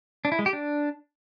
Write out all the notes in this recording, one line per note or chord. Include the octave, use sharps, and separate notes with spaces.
D4
E4
G#3
G4
D4